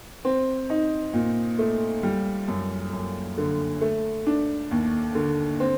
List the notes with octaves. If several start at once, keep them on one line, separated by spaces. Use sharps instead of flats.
C4
D#4
A#2
A3
G3
F#2
F#2
D3
A3
D4
D#2
D3
C4